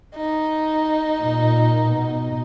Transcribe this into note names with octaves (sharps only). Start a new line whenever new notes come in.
D#4
A#2
B2